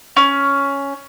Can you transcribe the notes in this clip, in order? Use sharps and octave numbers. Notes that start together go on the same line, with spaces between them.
C#4